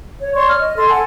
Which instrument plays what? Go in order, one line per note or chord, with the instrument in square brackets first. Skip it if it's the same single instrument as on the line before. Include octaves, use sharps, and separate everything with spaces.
[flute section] C#5
C#5 D5 C6 C#6
F6
D#5
A4 C6
A4 F#5 G#5 A5